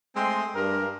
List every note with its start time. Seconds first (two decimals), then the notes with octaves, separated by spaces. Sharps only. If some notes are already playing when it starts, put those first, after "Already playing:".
0.16 G#3 A3 C4 G5 C6
0.55 G2 A#4